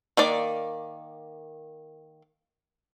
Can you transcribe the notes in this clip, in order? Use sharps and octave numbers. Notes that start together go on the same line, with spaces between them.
D#3 A#3 D5